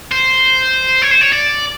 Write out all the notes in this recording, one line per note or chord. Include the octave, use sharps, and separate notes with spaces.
C5
C#5
C5
C#5
D5